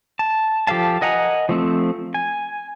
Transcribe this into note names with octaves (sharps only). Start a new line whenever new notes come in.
A5
F3 G4 A4 F5 A5
A#4 D#5 F#5 G#5 A#5
F3 A3 C4
G#5